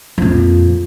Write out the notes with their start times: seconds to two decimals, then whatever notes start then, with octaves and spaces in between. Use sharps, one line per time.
0.18 F2 A#2